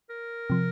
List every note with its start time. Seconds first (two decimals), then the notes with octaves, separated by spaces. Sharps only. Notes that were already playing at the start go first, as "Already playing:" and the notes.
0.10 A#4
0.50 C3 F3